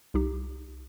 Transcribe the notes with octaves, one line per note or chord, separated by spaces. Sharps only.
C2 D#4 G4